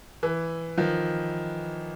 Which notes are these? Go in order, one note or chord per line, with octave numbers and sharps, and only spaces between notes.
E3
D#3 F3